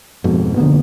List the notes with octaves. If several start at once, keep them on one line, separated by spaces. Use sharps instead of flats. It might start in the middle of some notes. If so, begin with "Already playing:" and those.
F2 G#2 B2
D1 D3 A#3 B3